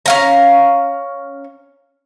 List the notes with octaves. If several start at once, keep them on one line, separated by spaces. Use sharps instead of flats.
C#4 F5 A#5